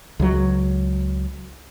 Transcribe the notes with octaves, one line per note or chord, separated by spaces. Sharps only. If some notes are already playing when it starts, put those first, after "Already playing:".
C#2 F#3